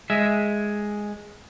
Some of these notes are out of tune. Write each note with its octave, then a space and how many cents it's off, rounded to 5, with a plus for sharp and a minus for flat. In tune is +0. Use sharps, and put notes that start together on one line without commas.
G#3 +0 E5 +0